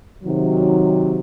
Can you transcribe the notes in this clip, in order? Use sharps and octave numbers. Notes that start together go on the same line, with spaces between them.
C3 D#3 F#3